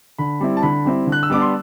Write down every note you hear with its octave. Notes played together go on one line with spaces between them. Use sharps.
D3 B5
G3 C4 E4
A5
D3 B5
G3 C4 E4
D3
F#6
E6
G3 B3 D4 D6
C6